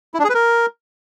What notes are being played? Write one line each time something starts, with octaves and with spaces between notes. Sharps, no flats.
E4
D4
G#4
B4
A#4